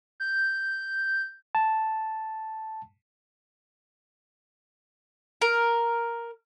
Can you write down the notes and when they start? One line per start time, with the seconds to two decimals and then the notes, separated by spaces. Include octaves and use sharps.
0.20 G6
1.55 A5
5.42 A#4